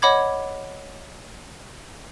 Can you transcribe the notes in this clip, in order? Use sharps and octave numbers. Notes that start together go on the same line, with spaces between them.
C#5 D#5 F#5 B5 D6 G#6